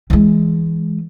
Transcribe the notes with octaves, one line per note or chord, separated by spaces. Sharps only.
E3 G#3